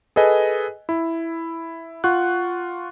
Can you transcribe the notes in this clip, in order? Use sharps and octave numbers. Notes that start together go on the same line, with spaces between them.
G#4 A4 B4 D#5 G#5
E4
F4 F#5 C#6 F#6